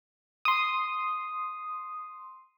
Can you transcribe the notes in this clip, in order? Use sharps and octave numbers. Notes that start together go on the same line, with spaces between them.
C6 D#6